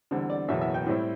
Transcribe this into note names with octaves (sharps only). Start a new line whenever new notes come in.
E2 D3 G3 C4
D5
F#1 E2 B2 F#3 E5
E5
G5
A2 G3 C4 E4